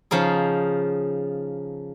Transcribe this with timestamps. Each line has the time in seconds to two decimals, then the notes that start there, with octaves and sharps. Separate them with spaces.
0.11 C#3 F3 D#4 G#4